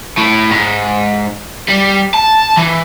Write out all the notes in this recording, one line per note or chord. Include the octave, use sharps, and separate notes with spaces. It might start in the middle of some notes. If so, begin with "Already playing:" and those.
A2
G#2
G3
A5
E3